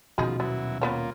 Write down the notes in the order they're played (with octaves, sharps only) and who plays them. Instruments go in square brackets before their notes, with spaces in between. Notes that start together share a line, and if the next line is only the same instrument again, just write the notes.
[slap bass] D#1 B2 C#4 [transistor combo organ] F3 [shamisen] D#4 G#4 B5 [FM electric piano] F#4
[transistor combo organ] F#3 E4 [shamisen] B3
[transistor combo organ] A#3 F4 [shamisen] B3 B4 C#5